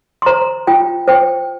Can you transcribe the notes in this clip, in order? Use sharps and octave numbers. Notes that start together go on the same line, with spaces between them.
C6
C5 A#5
F4 G5
C5 G5